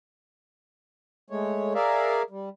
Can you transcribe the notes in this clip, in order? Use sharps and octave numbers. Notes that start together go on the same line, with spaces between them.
G#3 A3 C#5
G#4 A#4 D5 E5 F5
G3